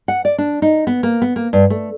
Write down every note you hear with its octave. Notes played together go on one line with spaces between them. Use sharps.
F#5
D5
D4
D#4
B3
A#3
B3
A#3
G2
A3